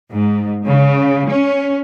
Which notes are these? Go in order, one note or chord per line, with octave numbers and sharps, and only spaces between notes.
G#2
C#3
C#4